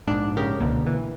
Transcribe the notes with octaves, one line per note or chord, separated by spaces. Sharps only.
A#1 G#2 D4
C#3 G4 A#4
C#2 B2 D3 A#3
E3